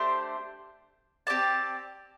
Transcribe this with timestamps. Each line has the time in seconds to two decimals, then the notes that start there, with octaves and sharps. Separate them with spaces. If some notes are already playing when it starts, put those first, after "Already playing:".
Already playing: A3 D4 G4 C5
1.27 C4 G4 D5 A5